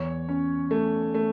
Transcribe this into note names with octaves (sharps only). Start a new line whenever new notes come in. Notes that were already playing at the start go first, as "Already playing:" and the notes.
Already playing: E2 C#5
C#4
A3
A3